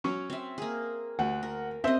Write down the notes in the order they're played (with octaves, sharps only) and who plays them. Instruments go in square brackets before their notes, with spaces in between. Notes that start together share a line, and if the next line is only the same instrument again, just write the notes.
[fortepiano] F#3 C#4 C#6
[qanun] C4 E5
A#3 G#4
[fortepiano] D2 [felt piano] F#5
[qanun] A#4
[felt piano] C4 E5 [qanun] C5 D#5